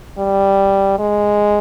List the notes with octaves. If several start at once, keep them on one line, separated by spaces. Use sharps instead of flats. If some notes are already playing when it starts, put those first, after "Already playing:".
G3
G#3